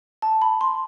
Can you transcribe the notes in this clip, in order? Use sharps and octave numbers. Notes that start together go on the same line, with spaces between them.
A5
B5
C6